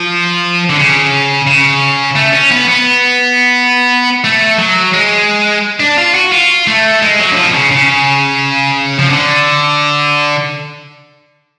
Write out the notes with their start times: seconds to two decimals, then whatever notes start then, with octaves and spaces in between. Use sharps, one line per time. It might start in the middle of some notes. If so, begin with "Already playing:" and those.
Already playing: F3
0.70 D3
0.78 C#3
1.47 C#3
2.16 A3
2.33 C#4
2.51 B3
2.68 B3
4.24 A3
4.58 F#3
4.94 G#3
5.80 D4
5.97 F4
6.14 F#4
6.32 F4
6.67 A3
7.02 G#3
7.19 F#3
7.32 D3
7.36 F3
7.46 B2
7.54 C#3
7.71 C#3
8.99 F3
9.09 D3